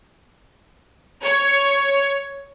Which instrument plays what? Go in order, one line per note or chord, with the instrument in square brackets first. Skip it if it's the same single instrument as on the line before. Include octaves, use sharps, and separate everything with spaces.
[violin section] C#5